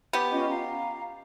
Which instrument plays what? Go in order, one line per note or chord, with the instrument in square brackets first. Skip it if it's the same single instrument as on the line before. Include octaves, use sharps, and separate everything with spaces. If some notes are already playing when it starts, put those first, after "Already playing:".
[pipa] B3 G4
[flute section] C#4 F4 D#5
F5 A#5